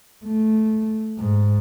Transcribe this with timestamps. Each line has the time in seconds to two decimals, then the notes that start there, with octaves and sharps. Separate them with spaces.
0.25 A3
1.18 G#2